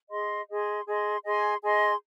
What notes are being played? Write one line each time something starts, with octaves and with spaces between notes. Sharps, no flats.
G#4 D#5 C6
G#4 D#5 C6
G#4 D#5 C6
G#4 D#5 G#5 C6
G#4 D#5 G#5 C6